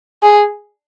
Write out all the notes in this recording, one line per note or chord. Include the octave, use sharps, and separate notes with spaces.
G#4